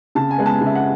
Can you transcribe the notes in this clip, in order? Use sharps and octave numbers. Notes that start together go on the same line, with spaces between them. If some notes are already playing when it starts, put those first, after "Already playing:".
C#3 A5
G#5
G#3 B3
A5
C#3
E5
F#5